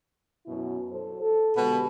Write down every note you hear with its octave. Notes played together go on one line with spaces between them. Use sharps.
F#2 B2 E4
F#3 A4 C5
A4
B2 D3 G#3 G4